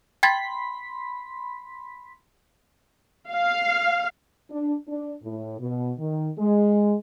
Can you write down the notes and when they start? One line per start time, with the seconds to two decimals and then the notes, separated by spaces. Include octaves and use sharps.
0.23 G5 B5 C6 G#6 A6 B6
3.32 F5
4.51 D4
4.88 D4
5.23 A2
5.59 B2
5.98 D#3
6.38 G#3